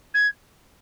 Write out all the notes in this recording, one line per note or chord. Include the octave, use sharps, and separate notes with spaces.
G#6